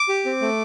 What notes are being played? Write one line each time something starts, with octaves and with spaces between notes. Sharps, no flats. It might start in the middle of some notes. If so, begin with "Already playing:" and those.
Already playing: D6
G4
C4
A3